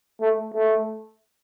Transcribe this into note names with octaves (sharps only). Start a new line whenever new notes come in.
A3
A3